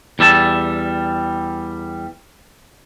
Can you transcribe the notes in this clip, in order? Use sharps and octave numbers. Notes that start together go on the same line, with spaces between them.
E2 G3 E5 A5